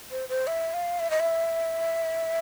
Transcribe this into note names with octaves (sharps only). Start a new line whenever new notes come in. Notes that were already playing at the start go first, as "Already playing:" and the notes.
C5
C5
E5
F5
E5
D#5
E5